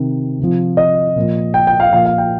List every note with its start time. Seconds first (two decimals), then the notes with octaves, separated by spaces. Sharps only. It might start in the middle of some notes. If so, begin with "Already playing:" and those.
Already playing: C3 D#3
0.39 C3 F3
0.77 D#5
1.16 A#2 F3
1.54 G5
1.67 G5
1.80 F5
1.93 A#2 F3 F5
2.05 F5
2.18 G5